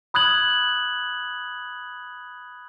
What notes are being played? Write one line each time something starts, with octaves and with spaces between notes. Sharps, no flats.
B5 D#6 F#6 G#6 F#7